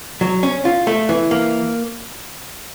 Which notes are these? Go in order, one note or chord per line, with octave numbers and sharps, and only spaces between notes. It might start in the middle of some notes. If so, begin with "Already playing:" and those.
F#3
C#4
F4
A3
E3
A#3